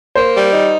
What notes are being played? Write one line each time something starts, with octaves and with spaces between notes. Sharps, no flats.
A#3 C5
G3
D#4